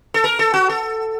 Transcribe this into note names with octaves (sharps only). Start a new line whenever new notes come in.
A4
A#4
A4
F#4
A4